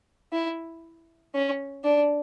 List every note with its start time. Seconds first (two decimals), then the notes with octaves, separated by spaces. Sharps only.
0.32 E4
1.34 C#4
1.84 D4